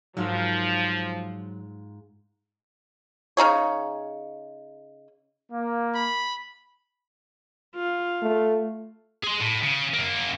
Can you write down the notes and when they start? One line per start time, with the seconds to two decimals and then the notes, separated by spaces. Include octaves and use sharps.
0.17 G#2 F3 F#3 F4 A#4
3.37 C#3 D#4 G#4 C#5
5.52 A#3
5.95 B5
7.76 F4
8.22 A3
9.24 G#4 C6
9.42 A2
9.63 C#3
9.94 F#2 A#3